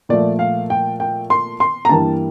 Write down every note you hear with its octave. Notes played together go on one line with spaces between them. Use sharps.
A#2 F3 A3 D5
F5
G5
G5
C6
C6
A#5
G2 E3 G3 A#3 A5